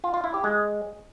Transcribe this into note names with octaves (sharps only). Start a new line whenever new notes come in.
F4
F4
E4
G4
G#3